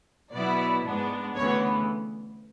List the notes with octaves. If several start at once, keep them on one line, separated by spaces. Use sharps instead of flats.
B2 F#3 B3 E4 D5
G#2 G#3 B3 D4
D2 C#3 E3 B3 C#5